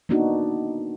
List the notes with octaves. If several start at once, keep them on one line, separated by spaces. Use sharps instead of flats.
A#3 B3 D4 D#4 F#4